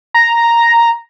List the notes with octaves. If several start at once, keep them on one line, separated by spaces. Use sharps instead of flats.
A#5